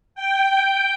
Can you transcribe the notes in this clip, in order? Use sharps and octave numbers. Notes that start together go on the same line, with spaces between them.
G5